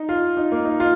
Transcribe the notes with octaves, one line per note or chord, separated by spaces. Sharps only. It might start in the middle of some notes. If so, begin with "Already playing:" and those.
Already playing: D#4
F4
D#4
A#3
D#4
F4